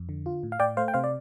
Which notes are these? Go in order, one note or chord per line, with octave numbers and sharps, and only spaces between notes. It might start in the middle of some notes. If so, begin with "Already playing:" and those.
Already playing: F2
D3
F4
A2
F5
A2 D5 G5
A3 C5 F5
G5
C3 C5 F5
D5